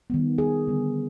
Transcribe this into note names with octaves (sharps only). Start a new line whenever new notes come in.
D#3 G3 B3
G#4
D3 G3 B3 D4